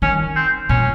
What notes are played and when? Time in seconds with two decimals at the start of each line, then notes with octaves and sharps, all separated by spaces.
0.02 D#3 C#4
0.36 C4
0.69 A#2 C#4